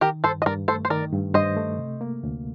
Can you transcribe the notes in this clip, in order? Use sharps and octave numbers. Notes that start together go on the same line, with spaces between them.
D#3 G4 A#4
G2 A4 C5
D#5
G2 A#4 D5
A3 A4 C5
C5
D#3 A#4 D5
G2
G2 C5 D#5
A3
C3
A#3
D2